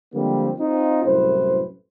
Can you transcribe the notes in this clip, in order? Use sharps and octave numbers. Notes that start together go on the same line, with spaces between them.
D3 F3 G3 G#3 A#3 C4
C4 D#4 F4
C2 F#2 A2 B4 C5